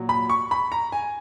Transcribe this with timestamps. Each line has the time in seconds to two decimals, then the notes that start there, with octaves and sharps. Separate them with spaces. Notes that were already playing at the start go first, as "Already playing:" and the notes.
Already playing: A#2 F#3
0.09 B5
0.30 C#6
0.51 B5
0.72 A#5
0.92 G#5